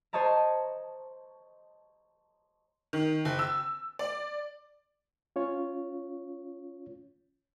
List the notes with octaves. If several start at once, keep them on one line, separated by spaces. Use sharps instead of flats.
C5 C#5 D#5 A5 A#5
D#3
F#1
E6
D5
C#4 F4 C#5